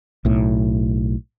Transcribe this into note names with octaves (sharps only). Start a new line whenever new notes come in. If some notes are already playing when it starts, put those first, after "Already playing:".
B1 A2